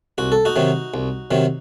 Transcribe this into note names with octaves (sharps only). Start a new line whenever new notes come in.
C2 F#4
A4
D#4 F#4
C3 D#3 F#3
C2
C3 D#3 F#3